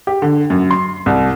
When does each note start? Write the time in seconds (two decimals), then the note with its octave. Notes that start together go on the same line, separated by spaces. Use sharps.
0.07 G4
0.22 D3
0.50 F#2
0.71 C6
1.06 C2